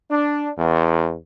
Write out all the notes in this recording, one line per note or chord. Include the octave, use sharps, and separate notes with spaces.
D4
E2